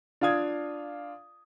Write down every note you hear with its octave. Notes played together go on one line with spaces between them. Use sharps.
D4 F4 F5 D#6 G#6